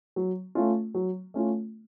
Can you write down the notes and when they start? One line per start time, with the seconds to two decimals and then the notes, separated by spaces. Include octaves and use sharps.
0.16 F#3
0.55 A3 C#4 F4
0.95 F#3
1.34 A3 C#4 F4